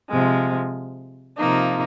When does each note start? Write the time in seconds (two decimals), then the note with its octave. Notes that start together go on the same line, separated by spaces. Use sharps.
0.09 C3 F3 G#3
1.37 C3 F3 A#3 D#4